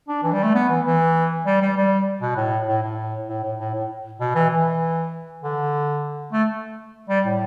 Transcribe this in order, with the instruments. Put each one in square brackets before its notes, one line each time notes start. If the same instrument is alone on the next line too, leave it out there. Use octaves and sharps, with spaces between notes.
[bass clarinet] D4
E3
G3
A3
B3
E3
E3
G3
G3
G3
B2
A2
A2
A2
A2
A2
A2
A2
B2
E3
E3
D3
A3
G3
A2